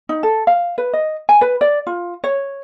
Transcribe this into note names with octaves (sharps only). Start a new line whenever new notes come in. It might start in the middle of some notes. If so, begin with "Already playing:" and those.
D#4
A4
F5
B4
D#5
G#5
B4
D5
F4
C#5